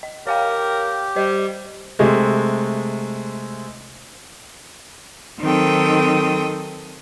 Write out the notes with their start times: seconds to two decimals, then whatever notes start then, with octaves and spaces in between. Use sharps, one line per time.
0.03 D#5
0.27 G4 A#4 C#5 F5 G5
1.16 G3 C5 D#5
1.99 C3 G#3 A3
5.41 D#3 F#3 C4 A4 G5 D#6